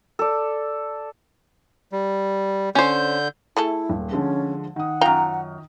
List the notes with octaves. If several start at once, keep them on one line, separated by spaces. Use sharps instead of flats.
A4 D5
G3
D3 C#4 C5 G6
A3 E4 G#4 A4
D#1
D3 F3 G#3 C#4
D#3 F#5 D#6
F#2 F4 G5 A#5